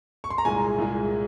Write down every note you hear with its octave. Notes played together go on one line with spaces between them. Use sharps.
C#6
C6
A#5
C2 A#2 G#3 G#5
C2 A#2 G#3